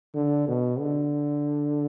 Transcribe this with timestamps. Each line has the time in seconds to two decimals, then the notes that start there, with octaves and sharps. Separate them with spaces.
0.15 D3
0.48 B2
0.80 D3